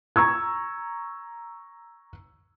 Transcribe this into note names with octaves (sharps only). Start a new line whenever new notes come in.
A#5 C#6 E6 G#6